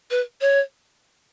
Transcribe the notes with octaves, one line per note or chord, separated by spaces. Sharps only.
B4
C#5